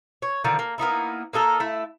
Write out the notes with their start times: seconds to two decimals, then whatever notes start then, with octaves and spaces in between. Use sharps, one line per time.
0.22 C#5
0.44 D3 D#3 F3 D4
0.59 A#3
0.78 A#3 B3 D#4 E4
1.33 A#3 D#4 A4 A#4
1.60 A3 E4